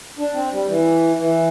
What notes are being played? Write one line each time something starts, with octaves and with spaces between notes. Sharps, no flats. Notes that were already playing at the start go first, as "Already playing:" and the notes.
D4
C4
G3
E3
E3